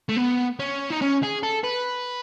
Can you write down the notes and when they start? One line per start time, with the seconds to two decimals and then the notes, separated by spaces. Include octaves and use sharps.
0.09 A3
0.17 B3
0.59 C#4
0.90 D#4
1.01 C#4
1.23 G#4
1.43 A4
1.64 B4